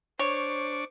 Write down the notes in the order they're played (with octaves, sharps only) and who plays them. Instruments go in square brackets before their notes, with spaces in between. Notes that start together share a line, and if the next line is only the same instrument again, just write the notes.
[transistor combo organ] D4 C#6 D6 [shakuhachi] C5 [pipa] C#5